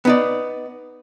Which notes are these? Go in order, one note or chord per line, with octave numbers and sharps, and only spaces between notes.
B3 D#4 D5